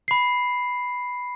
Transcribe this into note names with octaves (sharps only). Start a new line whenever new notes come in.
B5 C7